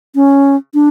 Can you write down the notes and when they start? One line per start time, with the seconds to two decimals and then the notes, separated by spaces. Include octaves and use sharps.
0.15 C#4
0.74 D4